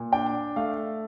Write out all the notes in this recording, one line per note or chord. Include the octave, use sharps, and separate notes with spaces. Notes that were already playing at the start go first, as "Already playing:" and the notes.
Already playing: A#2
D4 G5
A3 F5